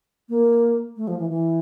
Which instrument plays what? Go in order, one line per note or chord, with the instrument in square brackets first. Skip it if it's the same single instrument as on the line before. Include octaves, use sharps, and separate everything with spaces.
[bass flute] A#3
A3
F3
E3
E3